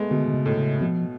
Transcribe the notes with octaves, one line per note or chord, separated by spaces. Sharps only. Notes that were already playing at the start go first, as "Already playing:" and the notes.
Already playing: G#3 A3 B3
B2 D3
D3
C#3
A2
C#3
B2 F3